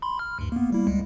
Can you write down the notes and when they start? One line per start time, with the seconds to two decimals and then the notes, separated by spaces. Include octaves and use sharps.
0.02 B5 C6
0.19 F6
0.39 D2 G2
0.52 A#3 B3
0.72 G3 A#3 E4
0.87 C#2 G3 G#3